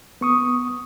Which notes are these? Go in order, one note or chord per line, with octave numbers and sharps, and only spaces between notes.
B3 C#6 D#6